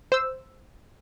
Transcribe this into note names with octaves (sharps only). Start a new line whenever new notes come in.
C5 E6